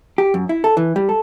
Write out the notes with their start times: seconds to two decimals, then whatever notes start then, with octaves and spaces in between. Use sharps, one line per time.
0.18 G4
0.34 F#2
0.49 E4
0.64 A4
0.77 E3
0.96 G3
1.09 A4